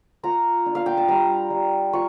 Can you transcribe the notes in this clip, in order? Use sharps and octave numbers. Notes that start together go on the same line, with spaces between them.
F4 A#5
D4
F5
G5
A5
G3 A#5
G3
F4 C#6